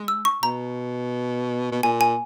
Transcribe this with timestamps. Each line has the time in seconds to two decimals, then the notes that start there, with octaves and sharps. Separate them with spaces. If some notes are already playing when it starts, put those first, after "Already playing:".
Already playing: G#3
0.08 E6
0.25 C#6
0.43 B2 A#5
1.72 B2
1.83 A#2 G#5
2.01 G#5